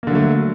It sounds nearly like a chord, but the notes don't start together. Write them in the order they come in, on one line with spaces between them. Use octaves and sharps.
A#3 D3 F#3 A3